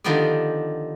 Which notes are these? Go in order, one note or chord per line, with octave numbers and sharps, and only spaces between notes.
D3 D#3 F3 B3 G4 D5